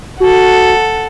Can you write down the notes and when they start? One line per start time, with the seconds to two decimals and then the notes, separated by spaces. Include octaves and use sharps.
0.20 F#4 A4 F#5